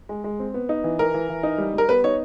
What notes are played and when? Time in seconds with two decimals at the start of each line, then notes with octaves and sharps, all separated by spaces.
0.09 G#3
0.24 G#3
0.39 C4
0.54 B3
0.69 D#4
0.84 E3
0.99 E3 A#4
1.14 E3
1.29 E3
1.43 D#4
1.58 G3
1.74 G3 A#4
1.89 B3 B4
2.04 D#4 C#5